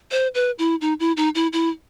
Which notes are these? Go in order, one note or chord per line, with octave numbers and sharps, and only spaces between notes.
C5
B4
E4
D#4
E4
D#4
E4
E4